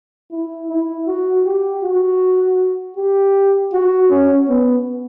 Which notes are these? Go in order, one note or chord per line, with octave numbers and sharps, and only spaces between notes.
E4
E4
F#4
G4
F#4
G4
F#4
C#4
B3